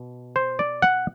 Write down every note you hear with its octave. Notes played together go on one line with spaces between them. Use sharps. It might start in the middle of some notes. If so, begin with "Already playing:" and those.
Already playing: B2
C5
D5
F#5